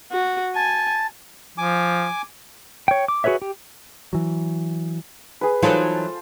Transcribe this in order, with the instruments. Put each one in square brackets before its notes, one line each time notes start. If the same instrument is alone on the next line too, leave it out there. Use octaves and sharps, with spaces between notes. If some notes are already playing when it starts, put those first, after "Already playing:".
[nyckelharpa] F#4
[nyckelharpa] G#5 [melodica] A5
[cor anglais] F3 [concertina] G#5 D6
[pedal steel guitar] C#5 G5
D6
F#4 G#4 B4 C#5 E5
G4
[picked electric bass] E3 F#3
[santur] G#4 B4
[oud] E3 F#3 D#4 [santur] F4 A4 C5